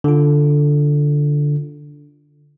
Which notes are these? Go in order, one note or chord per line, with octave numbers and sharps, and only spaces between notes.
D3 F4